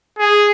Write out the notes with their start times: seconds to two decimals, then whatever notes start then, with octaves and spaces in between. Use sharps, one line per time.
0.19 G#4